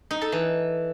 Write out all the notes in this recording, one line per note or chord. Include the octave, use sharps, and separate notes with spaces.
D#4
A4
E3